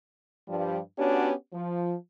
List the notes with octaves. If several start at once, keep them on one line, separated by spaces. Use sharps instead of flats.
G2 F3 G3
B3 C#4 D4 F#4 G4 C#5
F3